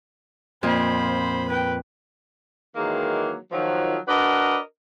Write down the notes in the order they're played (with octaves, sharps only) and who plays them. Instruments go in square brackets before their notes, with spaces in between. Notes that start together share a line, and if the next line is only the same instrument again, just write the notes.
[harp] F2 A#2 [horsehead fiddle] C5 B5
[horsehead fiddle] B4 G5
[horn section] D#3 E3 F#3 G#3 A#3
D#3 F3 F#3
D4 F#4 A#4 B4 D5 D#5